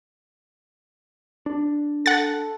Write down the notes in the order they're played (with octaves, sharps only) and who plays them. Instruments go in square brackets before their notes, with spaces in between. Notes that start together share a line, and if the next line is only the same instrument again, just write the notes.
[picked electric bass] D4
[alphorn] A4 [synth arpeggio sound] F#5 A6